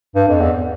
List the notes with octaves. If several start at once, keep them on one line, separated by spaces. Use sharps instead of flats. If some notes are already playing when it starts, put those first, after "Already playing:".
G2
F2
E2